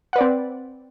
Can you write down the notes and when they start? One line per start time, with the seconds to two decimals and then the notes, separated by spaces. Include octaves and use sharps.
0.13 F#5
0.16 B4
0.18 D5
0.21 C4